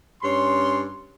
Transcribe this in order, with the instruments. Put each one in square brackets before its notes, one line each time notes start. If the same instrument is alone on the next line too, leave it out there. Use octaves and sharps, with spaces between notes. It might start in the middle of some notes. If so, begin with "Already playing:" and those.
[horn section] G2 C#4 C#5 C6